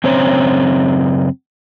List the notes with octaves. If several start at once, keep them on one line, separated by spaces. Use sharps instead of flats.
F#2 C#3 C4 C5 C#5 A#5